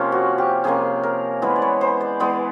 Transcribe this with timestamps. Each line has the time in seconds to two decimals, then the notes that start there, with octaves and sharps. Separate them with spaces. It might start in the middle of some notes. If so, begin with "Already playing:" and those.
Already playing: C3 F3 A#3 C#4
0.12 F#4
0.38 G4
0.64 C3 F3 A#3 C#4 G#4
1.03 A#4
1.42 E3 G#3 B3 B4
1.56 D5
1.62 C#5
1.81 C5
2.01 D5
2.20 E3 G#3 B3 D5